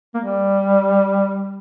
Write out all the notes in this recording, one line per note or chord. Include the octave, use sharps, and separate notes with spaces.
A#3
G3